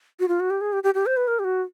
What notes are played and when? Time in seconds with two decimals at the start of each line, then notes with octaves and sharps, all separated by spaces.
0.20 F#4
0.28 F4
0.40 F#4
0.50 G4
0.61 G#4
0.73 G4
0.84 G4
0.95 G4
1.06 C5
1.17 B4
1.28 A#4
1.39 G4
1.44 F#4